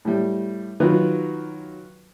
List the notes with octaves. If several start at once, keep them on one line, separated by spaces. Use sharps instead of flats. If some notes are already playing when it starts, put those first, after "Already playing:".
A2 G3
D#3 F#3 F4 B4